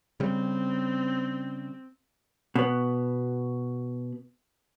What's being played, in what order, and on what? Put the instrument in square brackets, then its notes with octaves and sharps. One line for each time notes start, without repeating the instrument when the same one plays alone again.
[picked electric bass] C#3 G3 [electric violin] C4
[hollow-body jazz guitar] B2 B3